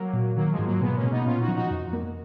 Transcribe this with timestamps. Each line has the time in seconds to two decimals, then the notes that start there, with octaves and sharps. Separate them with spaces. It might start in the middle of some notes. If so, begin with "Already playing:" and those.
Already playing: F#3 A#3
0.13 A#2
0.36 D#3 F#3 A#3
0.51 F3 G#3
0.58 G#2
0.65 F#3 A#3
0.81 B2 G#3 B3
0.96 A#3 C#4
1.03 B2
1.11 B3 D#4
1.25 A#2 C#4 F4
1.41 D#4 F#4
1.48 F3
1.55 D#4 F#4
1.71 F2
1.93 A#3